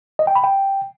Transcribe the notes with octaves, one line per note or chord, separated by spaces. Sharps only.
D#5
G5
B5
G5